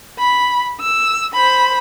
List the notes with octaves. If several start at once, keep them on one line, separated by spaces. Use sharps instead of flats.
B5
E6
C5 B5